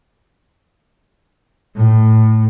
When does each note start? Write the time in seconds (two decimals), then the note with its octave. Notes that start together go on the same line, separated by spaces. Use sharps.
1.76 A2